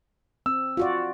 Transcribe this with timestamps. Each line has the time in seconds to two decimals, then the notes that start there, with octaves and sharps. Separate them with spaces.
0.46 C4 E6
0.77 F4 F#4 D5